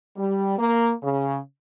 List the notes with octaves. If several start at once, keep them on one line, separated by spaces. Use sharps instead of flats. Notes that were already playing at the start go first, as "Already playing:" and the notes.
G3
A#3
C#3